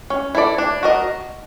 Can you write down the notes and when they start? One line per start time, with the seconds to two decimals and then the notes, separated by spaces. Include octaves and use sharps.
0.10 C#4
0.35 E4 A4 D5
0.58 D4
0.83 F#4 A#4 D#5